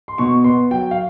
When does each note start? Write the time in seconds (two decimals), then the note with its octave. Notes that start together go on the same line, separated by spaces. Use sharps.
0.08 C6
0.18 B2 C#6
0.44 B3 C6
0.71 F#3 G5
0.91 F5